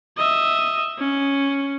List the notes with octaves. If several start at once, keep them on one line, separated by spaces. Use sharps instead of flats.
D#5 E5
C#4